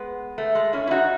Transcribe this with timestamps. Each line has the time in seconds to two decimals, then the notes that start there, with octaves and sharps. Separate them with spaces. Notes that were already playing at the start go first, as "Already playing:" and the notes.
Already playing: G#3 B3
0.38 A3
0.55 G#3
0.73 C#4 E4
0.87 E4
0.91 D#4 F#4